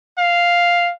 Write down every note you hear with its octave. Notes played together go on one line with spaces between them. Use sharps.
F5